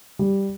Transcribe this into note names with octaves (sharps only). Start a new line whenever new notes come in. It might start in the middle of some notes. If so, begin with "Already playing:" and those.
G3